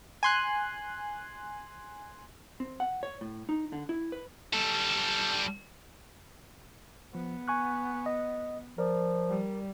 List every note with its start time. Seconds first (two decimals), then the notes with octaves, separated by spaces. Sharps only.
0.23 G#5 C6 F#6
2.60 C4
2.80 F#5
3.03 C#5
3.21 A2
3.49 D#4
3.73 D3
3.89 E4
4.12 B4
4.54 G3 A4
7.15 F3 B3
7.48 G#5 C#6 F#6
8.06 D#5
8.78 F3 A#4 D5
9.29 G3